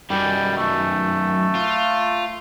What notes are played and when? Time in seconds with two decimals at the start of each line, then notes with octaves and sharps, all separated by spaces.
0.10 F#2 D#3 G3
0.57 A3
1.55 F4